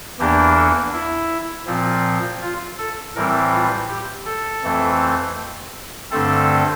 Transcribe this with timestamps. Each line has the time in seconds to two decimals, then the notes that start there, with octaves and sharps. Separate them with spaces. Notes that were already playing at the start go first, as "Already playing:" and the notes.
0.19 E2 E3 A#3 D4 G4
0.57 A4
0.93 E4
1.67 A#2 F3 C4
2.42 F4
2.78 A4
3.16 A2 E3 G3 C4 A#4
3.53 F4
3.89 G4
4.26 A4
4.63 F2 E3 A3 C4
6.11 G2 D3 A3 C4 A4